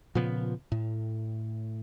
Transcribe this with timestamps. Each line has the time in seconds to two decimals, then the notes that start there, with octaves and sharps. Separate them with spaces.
0.15 A#2 C#3 F3 B3
0.72 A2